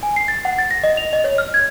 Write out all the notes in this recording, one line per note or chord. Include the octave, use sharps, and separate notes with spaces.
G#5
C7
A6
F#5
A6
A#6
D#5
F7
D#5
C#5
F6
G#6